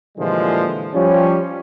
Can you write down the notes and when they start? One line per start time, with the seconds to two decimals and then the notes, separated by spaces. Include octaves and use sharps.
0.18 A#2 D3 E3 F3 G3 G#3
0.93 F3 G3 C#4